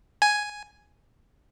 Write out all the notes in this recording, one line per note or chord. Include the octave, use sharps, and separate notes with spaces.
G#5